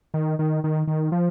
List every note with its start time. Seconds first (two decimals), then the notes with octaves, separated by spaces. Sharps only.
0.14 D#3
0.39 D#3
0.64 D#3
0.87 D#3
1.12 F3